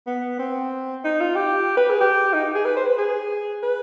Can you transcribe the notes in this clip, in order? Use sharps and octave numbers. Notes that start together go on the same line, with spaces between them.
B3
C4
D#4
F4
G4
B4
G#4
G4
D#4
G#4
B4
C5
B4
G#4
B4